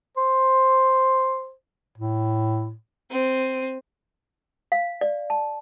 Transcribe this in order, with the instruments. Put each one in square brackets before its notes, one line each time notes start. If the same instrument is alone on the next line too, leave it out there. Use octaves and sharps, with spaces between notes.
[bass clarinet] C5
A2
[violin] C4 D#7
[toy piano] F5
D5
A5